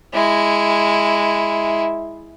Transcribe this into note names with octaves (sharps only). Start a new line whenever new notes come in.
G#3 E4